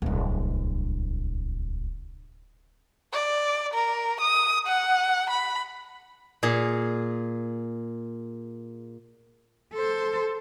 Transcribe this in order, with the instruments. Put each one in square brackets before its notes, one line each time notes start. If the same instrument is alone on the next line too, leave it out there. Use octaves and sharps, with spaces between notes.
[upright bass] D1 C2
[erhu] D5
A#4
D#6
F#5
B5
[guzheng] A#2 G#4
[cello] A4 C5